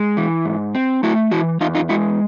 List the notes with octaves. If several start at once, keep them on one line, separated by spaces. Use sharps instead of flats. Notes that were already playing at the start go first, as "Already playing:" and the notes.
Already playing: G#3
E3
G#2
C4
A3 E4 F#4
E3 E4 F#4
E2 D#4 F4
D#4 F4
G#3 E4 F#4